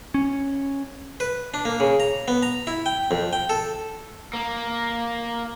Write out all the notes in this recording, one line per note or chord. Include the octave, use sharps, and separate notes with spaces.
C#4
B4
D4
A#3
C#3
A#5
B3
A#5
E4
G5
F2
G5
A4
A#3